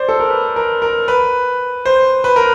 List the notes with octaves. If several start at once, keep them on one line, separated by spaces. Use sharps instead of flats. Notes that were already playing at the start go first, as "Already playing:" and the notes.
Already playing: C5 D5
A4
A#4
B4
A#4
A#4
B4
C5
B4
A#4